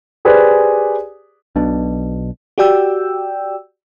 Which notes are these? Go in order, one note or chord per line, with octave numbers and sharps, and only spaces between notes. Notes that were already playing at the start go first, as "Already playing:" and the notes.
G4 G#4 B4 C5 D5 G#5
B1 B2 D4
F#4 G4 D5 G5 E6